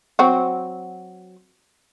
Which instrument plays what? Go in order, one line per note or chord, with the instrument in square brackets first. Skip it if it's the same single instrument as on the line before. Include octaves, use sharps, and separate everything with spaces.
[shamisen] F#3 C4 F#4